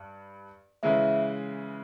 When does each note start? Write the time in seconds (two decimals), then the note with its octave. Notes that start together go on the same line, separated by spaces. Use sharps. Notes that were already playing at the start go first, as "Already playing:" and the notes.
Already playing: G2
0.83 C#3 E3 G#3 E5